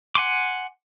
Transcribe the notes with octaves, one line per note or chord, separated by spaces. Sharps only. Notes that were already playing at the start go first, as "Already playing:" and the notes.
F#5 G#5 C6 D6